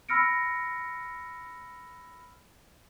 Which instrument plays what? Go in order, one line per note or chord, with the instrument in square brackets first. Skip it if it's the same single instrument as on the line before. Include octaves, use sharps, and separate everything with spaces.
[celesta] B5 E6 F6 A#6 C#7 D7